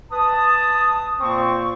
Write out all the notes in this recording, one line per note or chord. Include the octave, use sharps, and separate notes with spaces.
B4 A5 D#6
A#2 A#3 C4 C#6